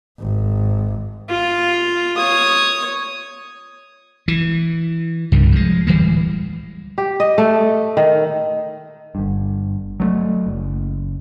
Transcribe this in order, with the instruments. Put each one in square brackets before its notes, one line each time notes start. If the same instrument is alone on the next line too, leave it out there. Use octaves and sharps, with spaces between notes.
[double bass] G#1
[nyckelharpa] F4
C#5 D#6
[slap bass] E3
C2 G2 C#3
F3 G#3
D1 E3 G3 G#3
[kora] G4
D#5
A3
D#3
[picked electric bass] G1 G2
F#3 G3 A3
F#1